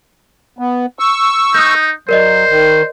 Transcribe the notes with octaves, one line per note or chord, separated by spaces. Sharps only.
B3
C#6 E6
D#4 D#6 F#6 G6
F#3 A#4 C5 D5 D#5
D#3